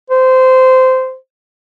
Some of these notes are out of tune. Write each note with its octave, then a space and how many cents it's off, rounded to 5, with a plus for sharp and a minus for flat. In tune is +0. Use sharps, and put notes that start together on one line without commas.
C5 -15